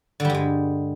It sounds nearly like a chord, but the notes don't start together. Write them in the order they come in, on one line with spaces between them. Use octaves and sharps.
D3 G3 G2 G#3